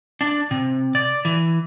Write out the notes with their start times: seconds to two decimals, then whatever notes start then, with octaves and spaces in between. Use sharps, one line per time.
0.21 D4
0.51 C3
0.95 D5
1.25 E3